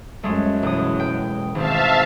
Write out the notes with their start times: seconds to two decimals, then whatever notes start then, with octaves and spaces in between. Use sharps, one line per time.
0.23 F#2 G#3 A3
0.63 E1 D#6
1.00 G5
1.55 G#1 C4 E5 F5 A5